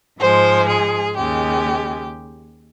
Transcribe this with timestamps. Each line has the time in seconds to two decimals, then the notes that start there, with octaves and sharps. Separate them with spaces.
0.19 G#2 F3 G#3 C5
0.67 G#4
1.16 D#2 C#3 G#3 G4